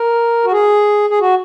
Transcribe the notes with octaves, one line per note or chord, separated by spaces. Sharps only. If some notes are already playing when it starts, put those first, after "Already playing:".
Already playing: A#4
F#4
G#4
G#4
F#4